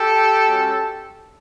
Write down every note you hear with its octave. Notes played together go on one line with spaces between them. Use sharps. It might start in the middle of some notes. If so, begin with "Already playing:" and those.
Already playing: G4 A4
G#3 C#4 F#4